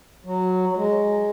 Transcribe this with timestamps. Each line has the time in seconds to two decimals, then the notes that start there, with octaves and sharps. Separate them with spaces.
0.24 F#3
0.69 F#3
0.75 G#3